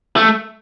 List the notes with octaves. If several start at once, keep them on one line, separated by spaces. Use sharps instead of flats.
A3